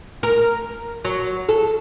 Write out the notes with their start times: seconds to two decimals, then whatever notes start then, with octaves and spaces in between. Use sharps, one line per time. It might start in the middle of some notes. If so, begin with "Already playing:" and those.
0.23 A#4
1.04 F#3
1.49 A4